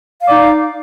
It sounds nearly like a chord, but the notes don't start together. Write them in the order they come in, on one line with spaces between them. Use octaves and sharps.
F5 D5 D#4